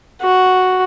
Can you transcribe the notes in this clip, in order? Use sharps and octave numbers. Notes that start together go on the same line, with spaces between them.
F#4